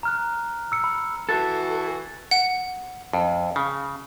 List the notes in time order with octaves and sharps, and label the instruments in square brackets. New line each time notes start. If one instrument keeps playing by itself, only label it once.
[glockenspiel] A#5 F6 F#6
E6 C#7
B5
[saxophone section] E3 F#4 [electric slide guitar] A4 [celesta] A6
[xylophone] F#5
[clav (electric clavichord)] F2
C#3